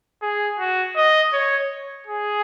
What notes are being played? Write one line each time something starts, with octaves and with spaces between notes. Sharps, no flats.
G#4
F#4
D#5
C#5
G#4